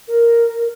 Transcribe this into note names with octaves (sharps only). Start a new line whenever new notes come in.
A#4